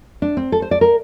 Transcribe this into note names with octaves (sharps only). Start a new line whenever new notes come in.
D4
C4
A4
C5
D5
A#4